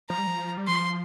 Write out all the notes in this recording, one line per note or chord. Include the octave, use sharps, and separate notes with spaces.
F3 A#5
G3
F3
G3
F3 C6